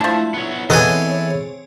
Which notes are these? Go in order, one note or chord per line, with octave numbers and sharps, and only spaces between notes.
F3 A3 D4 E4 E5 A5
B3 C#5
E3 B3 C4 G#4 A4 C#5 D#5 G#5